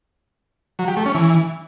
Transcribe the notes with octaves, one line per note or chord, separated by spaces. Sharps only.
F#3
G4
A3
C#4
E3